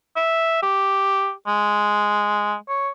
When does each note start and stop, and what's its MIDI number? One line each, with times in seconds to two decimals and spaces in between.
0.16 0.63 76
0.63 1.31 67
1.48 2.54 56
2.69 2.89 73